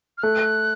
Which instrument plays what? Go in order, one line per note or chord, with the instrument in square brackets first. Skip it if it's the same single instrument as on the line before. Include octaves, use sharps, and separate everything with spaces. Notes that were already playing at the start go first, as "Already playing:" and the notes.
[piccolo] F6
[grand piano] A3 [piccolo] F#6